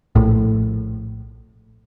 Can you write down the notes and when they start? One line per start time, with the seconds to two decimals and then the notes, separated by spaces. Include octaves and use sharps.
0.16 A#1 A2